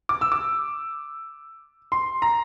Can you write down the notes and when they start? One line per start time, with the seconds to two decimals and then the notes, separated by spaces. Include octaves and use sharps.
0.09 D6
0.21 E6
0.32 D6
1.92 C6
2.22 A#5